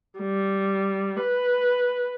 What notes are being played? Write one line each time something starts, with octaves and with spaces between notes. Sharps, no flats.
G3
B4